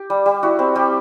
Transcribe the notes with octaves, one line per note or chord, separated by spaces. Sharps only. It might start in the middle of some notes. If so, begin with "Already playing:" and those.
Already playing: G4
G3
G3
E4 F#4
C4
G3 G4